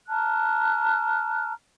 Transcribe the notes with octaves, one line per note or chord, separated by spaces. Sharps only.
A5 A#5 F6 F#6